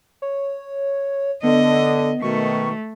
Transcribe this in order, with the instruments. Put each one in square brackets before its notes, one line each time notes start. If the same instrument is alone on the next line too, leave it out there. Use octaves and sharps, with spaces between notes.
[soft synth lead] C#5
[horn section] D3 [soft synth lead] B3 [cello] D#5
[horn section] B2 D#3 [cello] A3 [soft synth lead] C#6